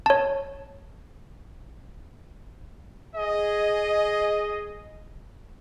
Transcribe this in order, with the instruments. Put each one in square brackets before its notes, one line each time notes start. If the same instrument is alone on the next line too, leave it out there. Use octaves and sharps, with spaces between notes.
[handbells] C#5 A5
[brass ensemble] G#4 D#5